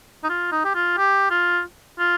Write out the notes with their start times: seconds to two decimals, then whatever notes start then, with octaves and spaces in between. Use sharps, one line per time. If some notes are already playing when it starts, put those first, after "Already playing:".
0.24 D#4
0.29 F4
0.52 D#4
0.65 G4
0.75 F4
0.98 G4
1.30 F4
1.99 F4